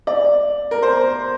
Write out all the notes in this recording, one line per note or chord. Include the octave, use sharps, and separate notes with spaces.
D5
A#4
C5